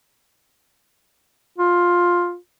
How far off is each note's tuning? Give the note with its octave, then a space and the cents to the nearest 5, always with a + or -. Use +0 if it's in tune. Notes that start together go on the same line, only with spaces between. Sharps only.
F4 +10